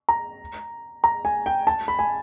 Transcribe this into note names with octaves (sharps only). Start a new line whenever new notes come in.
A#5
A#5
G#5
G5
A5
B5
G#5